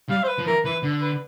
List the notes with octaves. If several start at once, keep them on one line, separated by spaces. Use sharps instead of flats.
G3 F5
C5
B4
F3
E3 A#4
E3 B4
D3
B4